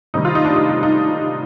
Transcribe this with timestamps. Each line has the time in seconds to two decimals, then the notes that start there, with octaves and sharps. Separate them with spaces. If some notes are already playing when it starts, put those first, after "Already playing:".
0.14 C3 D#3 G3 D#4
0.25 F4
0.35 D#4
0.45 D4
0.56 D#4
0.69 D#4
0.83 D#4